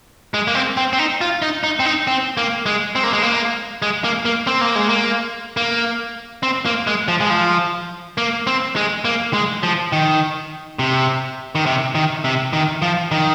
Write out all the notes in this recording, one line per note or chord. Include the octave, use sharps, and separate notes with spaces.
G#3
A#3
C4
C4
C4
D#4
F4
D#4
D#4
C4
D#4
C4
A#3
G#3
C4
A#3
G#3
A#3
G#3
A#3
A#3
C4
A#3
G#3
A#3
A#3
C4
A#3
G#3
F3
G#3
F3
A#3
C4
G#3
A#3
G#3
F3
D#3
C3
D#3
C3
D#3
C3
D#3
F3
D#3